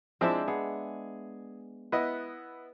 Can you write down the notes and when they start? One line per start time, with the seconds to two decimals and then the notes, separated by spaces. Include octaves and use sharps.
0.21 F3 G#3 C4 D4 E4 E5
0.48 B3 G#4
1.92 B3 E4 B4 D#5